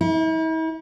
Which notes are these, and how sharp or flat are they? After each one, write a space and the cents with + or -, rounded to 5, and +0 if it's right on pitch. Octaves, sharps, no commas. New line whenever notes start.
E4 -45